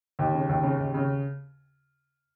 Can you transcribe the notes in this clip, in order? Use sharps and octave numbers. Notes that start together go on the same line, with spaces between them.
D#2
C#3
D#2
C#3
D#2
C#3